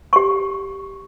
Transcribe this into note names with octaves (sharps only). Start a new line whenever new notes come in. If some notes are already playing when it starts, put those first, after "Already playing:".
G4 C#6